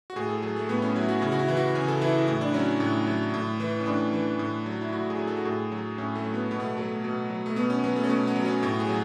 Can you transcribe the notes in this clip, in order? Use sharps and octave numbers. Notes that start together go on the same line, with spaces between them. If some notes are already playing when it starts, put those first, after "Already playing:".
F#4
A2 G#4
A4
F#3 G#4
A3
A2 B3
C#4
F#3 E4
F#4
C#3 E4
F#4
E4
E3
F#4
C#3 G#4
A4
E3 E4
A2 E4
D4
F#3 C#4
A2
F#3
A2
E3
C#4
A2 D4
E3
A2
F#3
E4
A2 F#4
G#4
F#3
A4
F#4
A2 G#4
F#3
A2 C#4
A3
F#3
B3
B2 B3
A3
F#3 A3
B2
F#3
A3
B2 B3
C#4
F#3 B3
A3
C#4
B2 B3
B3
F#3
C#4
A2 F#4
G#4
F#3